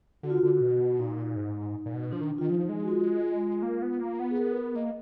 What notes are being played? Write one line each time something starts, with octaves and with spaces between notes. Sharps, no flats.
D3 F#4
F4
F#4
D3
B2
A#2 D#4
D#4
G#2
A#2
B2
F3 D4
D#3
D#3 F4
F3 D#4
G#3
F#4
F4
A#3
B3
A#3
B3
G#4
A#4
A#3 D#5